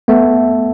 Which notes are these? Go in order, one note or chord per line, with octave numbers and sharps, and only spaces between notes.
A3 B3